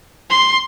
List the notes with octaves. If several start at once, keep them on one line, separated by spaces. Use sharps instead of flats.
C6